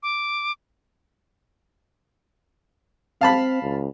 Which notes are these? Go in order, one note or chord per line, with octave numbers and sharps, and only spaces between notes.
D6
C4 F5 A5 B5
C#2